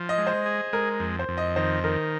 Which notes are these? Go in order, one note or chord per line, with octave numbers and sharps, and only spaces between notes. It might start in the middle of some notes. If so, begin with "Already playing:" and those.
Already playing: F3
D#5
G#3
C5
G#4
G#3 A#4
F2
C5
F2
D#5
D#3 C5
D#3 A#4